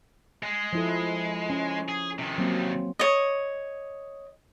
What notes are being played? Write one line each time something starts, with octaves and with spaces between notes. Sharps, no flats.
G#3
F3 E4 A4
C#4
G#4
C3 D#3
F#3 A#3 C4
C#5 D#5